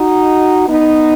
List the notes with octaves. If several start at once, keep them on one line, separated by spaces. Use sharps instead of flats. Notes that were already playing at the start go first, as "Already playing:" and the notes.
Already playing: D#4 F#4
B3 D#4